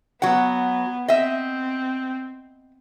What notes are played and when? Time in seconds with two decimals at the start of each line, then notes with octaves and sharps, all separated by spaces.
0.22 F#3 B3 F#5
1.08 C4 D#5 E5